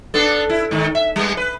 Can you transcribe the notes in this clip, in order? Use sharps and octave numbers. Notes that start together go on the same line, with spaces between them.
B3 D4 A4
E4
G#2 D#3
E5
G3 B3
B4